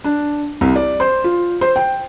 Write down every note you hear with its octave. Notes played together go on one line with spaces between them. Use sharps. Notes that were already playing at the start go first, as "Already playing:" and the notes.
D4
C2
D5
C5
F4
C5
G5